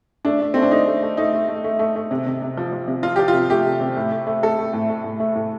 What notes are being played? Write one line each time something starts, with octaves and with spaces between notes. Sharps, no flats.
A3 D4
A3
A3 C4
D4
A3 D#4
A3
A3
A3 D#4
A3
A3
A3
A3
A3
C3
C3
C3
F3
F3
C3
F3 F4
F3 G4
F4
C3
A3 G4
C3
C3
A2
A3
A3
A3 A4
A3
A2
A3
A2
A3
A2